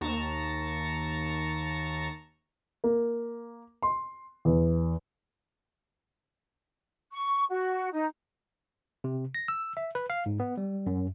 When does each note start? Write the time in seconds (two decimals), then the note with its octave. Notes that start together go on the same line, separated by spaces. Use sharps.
0.01 D#2 A5 A#5 C#6
2.84 A#3
3.82 C6
4.45 E2
7.12 C#6
7.49 F#4
7.92 D#4
9.04 C3
9.34 A#6
9.48 E6
9.77 E5
9.95 B4
10.10 F5
10.26 G#2
10.40 B3
10.57 G3
10.87 F#2